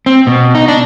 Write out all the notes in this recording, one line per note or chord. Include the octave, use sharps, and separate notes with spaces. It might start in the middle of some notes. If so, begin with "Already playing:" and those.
C4
B2
D#4
D4